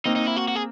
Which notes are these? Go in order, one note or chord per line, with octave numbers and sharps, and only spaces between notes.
A#3 C4 D#4
D#4
E4
F#4
F#4
G#4